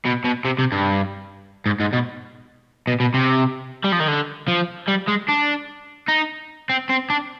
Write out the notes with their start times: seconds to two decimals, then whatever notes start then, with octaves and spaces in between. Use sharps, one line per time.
0.05 B2
0.25 B2
0.45 C3
0.59 C3
0.72 G2
1.66 G#2
1.80 G#2
1.93 B2
2.87 B2
3.00 B2
3.14 C3
3.84 G3
3.92 F3
4.00 D#3
4.08 D3
4.48 F3
4.88 G3
5.08 G#3
5.29 D4
6.08 D#4
6.70 C4
6.90 C4
7.10 D4